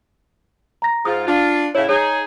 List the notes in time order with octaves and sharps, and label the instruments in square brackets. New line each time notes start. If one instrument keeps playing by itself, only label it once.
[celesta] A#5 A#6
[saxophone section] G#2 F4 [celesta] D#6
[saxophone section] D4 F4
[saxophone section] A2 C#3 E4 [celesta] C#5
[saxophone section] D#4 G#4 [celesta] C#5